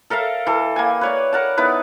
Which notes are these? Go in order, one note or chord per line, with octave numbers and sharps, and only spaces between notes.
A4 A#4 E5 F5
E3 A4
A#3 G5 G#5
B4 C#5 D5
A#4 F#5 A5
B3 D#4 E4 B4